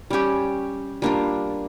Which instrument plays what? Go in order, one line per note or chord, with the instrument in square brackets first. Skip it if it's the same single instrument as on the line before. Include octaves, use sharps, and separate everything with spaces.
[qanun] G3 C#4 G4
G3 A#3 D4 F4